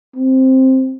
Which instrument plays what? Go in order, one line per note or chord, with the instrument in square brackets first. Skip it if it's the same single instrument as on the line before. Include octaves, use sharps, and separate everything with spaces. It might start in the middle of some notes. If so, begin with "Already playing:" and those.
[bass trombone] C4